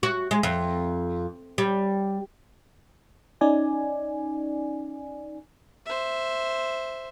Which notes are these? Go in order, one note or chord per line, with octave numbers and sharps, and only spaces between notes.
F#4
G#3
F2
G3
C#4 D#4 D5 G#5
C5 E5